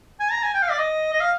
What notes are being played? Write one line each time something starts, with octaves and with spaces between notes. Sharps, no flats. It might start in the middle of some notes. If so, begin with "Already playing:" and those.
G#5
A#5
G#5
G5
F5
D5
D#5
D#5
F5